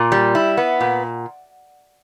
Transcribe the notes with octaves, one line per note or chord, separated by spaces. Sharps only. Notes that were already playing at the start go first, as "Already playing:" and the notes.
Already playing: A#2
G3
E4
B3
A#2